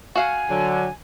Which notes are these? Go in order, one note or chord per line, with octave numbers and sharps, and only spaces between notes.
F#4 F5 F#5 G#5
D3 F#3